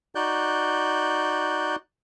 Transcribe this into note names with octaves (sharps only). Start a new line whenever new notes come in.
D#4 F#4 D5 F#6 G6